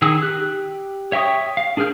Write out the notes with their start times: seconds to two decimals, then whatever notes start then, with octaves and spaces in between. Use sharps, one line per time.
0.02 D#3 G#4 E6
0.22 G4 F#6
1.12 C#5 E5 G5 C#6 D#6
1.57 F5
1.77 D4 G#4 A#4 F6 G6